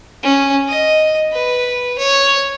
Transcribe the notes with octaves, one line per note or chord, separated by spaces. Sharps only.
C#4
D#5
B4
C#5